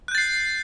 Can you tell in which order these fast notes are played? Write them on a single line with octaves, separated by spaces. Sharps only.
F#6 G6 A6 C7